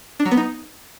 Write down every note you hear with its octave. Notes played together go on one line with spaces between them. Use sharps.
D4
F#3
B3
D#4